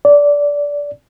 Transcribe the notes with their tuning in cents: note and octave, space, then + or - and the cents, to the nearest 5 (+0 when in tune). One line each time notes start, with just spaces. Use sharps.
D5 -15